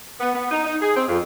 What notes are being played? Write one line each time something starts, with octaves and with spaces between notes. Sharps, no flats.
B3
B3
D#4
D#4
G#4
C4
F2